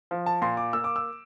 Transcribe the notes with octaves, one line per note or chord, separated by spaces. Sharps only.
F3
A5
A#2 C6
D6
A#3 E6
D6
E6